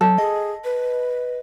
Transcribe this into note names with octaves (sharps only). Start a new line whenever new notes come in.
F#3 A4
G#4 D#5
B4